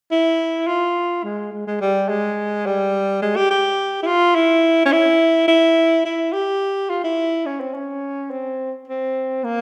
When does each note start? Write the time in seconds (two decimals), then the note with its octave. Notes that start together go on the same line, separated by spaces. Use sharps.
0.12 E4
0.67 F4
1.24 G#3
1.53 G#3
1.67 G#3
1.81 G3
2.09 G#3
2.66 G3
3.22 G#3
3.36 G4
3.50 G4
4.03 E4
4.07 F4
4.35 E4
4.85 C#4
4.92 E4
5.48 E4
6.05 E4
6.33 G4
6.90 F4
7.04 E4
7.46 C#4
7.60 C4
7.74 C#4
8.31 C4
8.88 C4
9.43 A#3